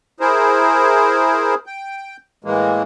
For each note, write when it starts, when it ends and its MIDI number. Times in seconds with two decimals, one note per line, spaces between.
0.20 1.55 64
0.20 1.55 68
0.20 1.55 70
0.20 1.55 72
1.66 2.17 79
2.44 2.83 45
2.44 2.83 52
2.44 2.83 56
2.44 2.83 58